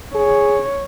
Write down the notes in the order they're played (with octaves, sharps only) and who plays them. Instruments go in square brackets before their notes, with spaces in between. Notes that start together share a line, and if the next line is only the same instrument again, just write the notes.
[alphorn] G#4 [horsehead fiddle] C#5